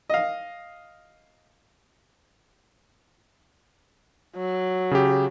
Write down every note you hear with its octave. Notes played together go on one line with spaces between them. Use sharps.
D#5 F5
F#3
C#3 G4